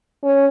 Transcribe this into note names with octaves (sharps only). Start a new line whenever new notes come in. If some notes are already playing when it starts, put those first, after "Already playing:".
C#4